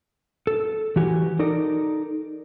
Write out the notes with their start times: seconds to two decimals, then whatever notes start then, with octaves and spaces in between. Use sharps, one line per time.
0.47 A4
0.96 E3 F#4 G4 G#5
1.39 D#4 A4 A#4 D5